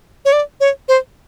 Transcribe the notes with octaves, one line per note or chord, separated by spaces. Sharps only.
C#5
D5
C#5
C5